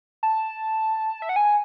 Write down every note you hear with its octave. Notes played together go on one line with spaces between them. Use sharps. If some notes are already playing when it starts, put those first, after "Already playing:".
A5
E5
F#5
G#5